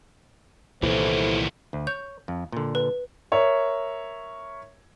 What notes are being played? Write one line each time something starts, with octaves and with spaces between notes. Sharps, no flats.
C2 A#2 D#3 E3 B3 E4 A4 C5
D2
C#5 G6
F2
A#2 D3
B4
A#4 C#5 E5